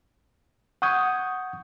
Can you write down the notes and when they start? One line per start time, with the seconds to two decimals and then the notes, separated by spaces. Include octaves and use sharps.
0.82 F#5 C#6 D#6 G6 G#6